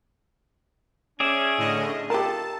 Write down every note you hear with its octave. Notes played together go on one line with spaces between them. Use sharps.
C#4 G#4 D5 E5
A2 D3 D#5
D#4 F4 G4 A4 A#4 A5